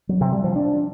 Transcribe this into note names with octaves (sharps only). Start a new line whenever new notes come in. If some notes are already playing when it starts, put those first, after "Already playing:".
F#3
C3
G3
F3
D4